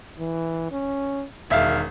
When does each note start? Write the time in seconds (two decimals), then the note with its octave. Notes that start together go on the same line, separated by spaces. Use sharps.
0.19 E3
0.72 C#4
1.50 E1 D#3 E5 F5